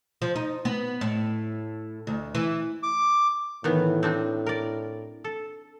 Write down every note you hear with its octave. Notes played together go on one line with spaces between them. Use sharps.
F3
D#4
B3
A2
D2
E3
D6
A2 D#3 E3 B3
C4 D4 D#4
A#4 D5
A4